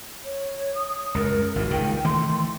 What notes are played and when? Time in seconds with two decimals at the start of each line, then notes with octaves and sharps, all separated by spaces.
0.24 C#5
0.74 D#6
1.15 C#2 F#2 A#4
1.56 G#1 E3
1.71 C#2 A#2 D#3 G5
2.04 D#3 E3 A3 C6